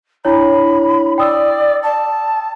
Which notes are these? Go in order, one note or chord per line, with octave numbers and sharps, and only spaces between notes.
D4 E4 C#5 B5
D5 G5 D#6 E6
A5